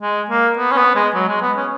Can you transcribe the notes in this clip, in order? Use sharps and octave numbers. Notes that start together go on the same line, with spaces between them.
G#3
A#3
B3
C#4
B3
G#3
F#3
G#3
B3
C#4